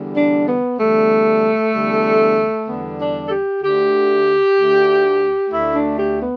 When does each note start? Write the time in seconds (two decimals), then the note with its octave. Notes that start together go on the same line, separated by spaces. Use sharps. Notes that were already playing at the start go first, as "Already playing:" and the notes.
Already playing: E2 D3 G3
0.16 D4
0.47 B3
0.79 E2 D3 G3 A3
1.73 E2 D3 G3
2.67 E2 D3 G3 B3
2.99 D4
3.26 A4
3.30 G4
3.62 D2 D3 A3 G4
4.56 D2 D3 A3
5.50 D2 D3 A3 E4
5.75 D4
5.97 G4
6.21 B3